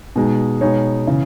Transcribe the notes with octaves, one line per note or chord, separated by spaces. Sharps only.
B2 G#3 D#4
B2 G#3 B3 D#4 C#5
C#3 E3